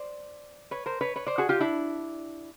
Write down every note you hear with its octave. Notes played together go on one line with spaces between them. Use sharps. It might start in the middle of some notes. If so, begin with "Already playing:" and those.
Already playing: C5 D5
B4 C#5
A#4 C5
B4 C#5
B4 C#5
C5 D5
F#4 G#4
F4 G4
D4 E4